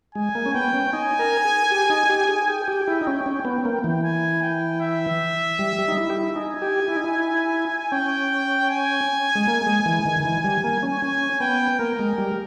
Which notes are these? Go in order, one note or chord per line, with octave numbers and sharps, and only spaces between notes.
G#3 G#5
A#3
C#4
B3 G5
C#4
D#4 G#5
A#4
G#4
G4
D#4
G4
G#4
G#4 G5
G4
E4
D#4
C#4
C#4
B3
A#3
E3
G#5
G5
E5
G3
G3
D#4
E4
G4
E4
D#4 G#5
G4
E4
D#4
E4
C#4 G5
G#5
G#3
A#3
G#3
E3
D#3
D#3
E3
G3
A#3
C#4
C#4 G#5
B3 G5
A#3 A#4
G#3
G3